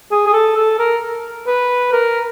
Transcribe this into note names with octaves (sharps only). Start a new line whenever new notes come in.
G#4
G#4
A4
A4
A#4
B4
A#4